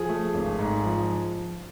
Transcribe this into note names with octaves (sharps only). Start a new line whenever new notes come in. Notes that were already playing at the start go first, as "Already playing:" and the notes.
Already playing: F3 G#4
A3
G#1
G#2
F3